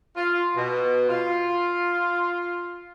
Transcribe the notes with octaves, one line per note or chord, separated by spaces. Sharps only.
F4
B2
F4